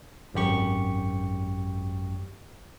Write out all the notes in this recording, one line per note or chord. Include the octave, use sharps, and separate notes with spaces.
G#1 F#2 G4 C#6